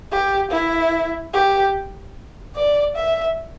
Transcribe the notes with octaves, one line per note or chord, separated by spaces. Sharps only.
G4
E4
G4
D5
E5